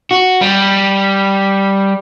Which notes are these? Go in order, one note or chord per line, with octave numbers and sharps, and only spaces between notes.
F#4
G3